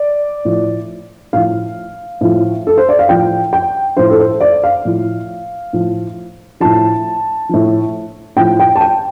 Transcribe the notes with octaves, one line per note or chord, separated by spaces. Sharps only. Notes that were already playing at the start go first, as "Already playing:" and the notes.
Already playing: D5
A2 F3
A2 F3 F5
A2 F3
A4
C5
D5
F5
A2 F3 G5
G5
A2 F3 C5
A4
C5
D5
F5
A2 F3
A2 F3
A2 F3 A5
A2 F3
A2 F3 G5
G5
A5
G5